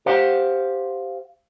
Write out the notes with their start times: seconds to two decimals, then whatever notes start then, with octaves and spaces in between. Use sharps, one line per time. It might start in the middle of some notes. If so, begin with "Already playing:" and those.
0.06 G4 C5 F5 F#5